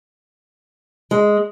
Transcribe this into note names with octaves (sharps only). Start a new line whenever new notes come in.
G#3